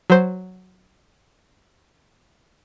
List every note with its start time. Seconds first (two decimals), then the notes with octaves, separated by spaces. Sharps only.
0.10 F#3 C5